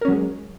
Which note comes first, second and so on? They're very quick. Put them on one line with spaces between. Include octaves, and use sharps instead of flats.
A#4 C#4 F#3 G#3